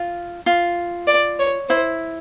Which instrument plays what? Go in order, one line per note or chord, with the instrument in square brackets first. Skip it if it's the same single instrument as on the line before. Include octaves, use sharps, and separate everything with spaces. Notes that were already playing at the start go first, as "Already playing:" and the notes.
Already playing: [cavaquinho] F4
F4
[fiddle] D5
C#5
[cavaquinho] E4 [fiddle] C5